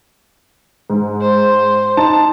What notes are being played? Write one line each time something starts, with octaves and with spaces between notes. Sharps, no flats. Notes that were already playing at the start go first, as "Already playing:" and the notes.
G#2
C5
D#4 A5